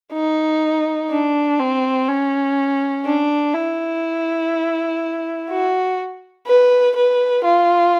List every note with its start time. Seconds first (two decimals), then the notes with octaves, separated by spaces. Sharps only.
0.13 D#4
1.11 D4
1.60 C4
2.08 C#4
3.06 D4
3.55 E4
5.50 F#4
6.47 B4
6.96 B4
7.45 F4